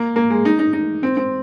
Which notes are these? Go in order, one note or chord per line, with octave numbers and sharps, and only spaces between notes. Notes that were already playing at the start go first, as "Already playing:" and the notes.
Already playing: A#3
A#3
G#3
D#4
D#4
D#4
C4
C4